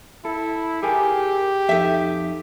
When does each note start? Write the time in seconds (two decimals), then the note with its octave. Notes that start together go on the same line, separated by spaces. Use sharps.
0.25 E4 A4
0.83 G4 G#4 A#4 G#5
1.69 F2 D#4 A4 E5